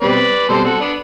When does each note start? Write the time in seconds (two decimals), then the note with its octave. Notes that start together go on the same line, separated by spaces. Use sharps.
0.01 B2 G3 C4 B4 D5
0.49 B2 G3 C4 A4 C5
0.64 F#4 A4
0.80 B3 D4